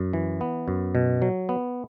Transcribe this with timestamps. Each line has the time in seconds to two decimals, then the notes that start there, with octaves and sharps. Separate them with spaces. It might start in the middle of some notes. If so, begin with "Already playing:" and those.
Already playing: F#2
0.13 E3
0.41 B3
0.68 F#2
0.95 B2
1.22 F#3
1.49 B3